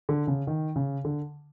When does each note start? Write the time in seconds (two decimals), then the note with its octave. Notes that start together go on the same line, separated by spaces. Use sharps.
0.09 D3
0.27 C#3
0.47 D#3
0.76 C#3
1.05 D3